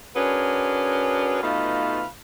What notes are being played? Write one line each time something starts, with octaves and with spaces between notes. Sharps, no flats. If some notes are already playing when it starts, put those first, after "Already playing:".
C#4 D4 F#4 G#4 A#4 B4
B2 A3 D#4 F4 B4 F5